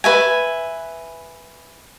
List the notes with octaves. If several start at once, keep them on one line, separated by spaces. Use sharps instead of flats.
B4 E5 G#5